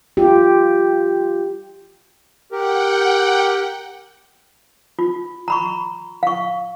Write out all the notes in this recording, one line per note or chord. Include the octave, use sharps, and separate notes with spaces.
F4 G4
G4 A#4 F#5 G5
F4
A#5 B5 C#6
F5 C#6